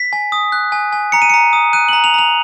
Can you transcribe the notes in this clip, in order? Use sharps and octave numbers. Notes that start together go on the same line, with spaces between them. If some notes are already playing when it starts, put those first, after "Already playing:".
Already playing: B6
G#5
D#6
F#6
G#5
G#5
A#5 C#7
D#7
A#5 C#7
D#6
F#6 D#7
A#5 F#7
F7
A#5 F7